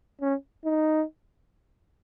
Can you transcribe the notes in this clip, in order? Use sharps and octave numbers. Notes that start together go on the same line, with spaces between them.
C#4
D#4